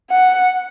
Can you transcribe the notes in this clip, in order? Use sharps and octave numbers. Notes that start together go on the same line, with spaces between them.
F#5